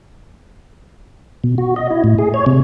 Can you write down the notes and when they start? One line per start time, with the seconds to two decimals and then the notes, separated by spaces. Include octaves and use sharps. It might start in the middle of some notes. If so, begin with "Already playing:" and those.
1.44 B2
1.58 F#4
1.76 D#5
1.91 E4
2.04 A2
2.19 G#4
2.34 C#5
2.46 C3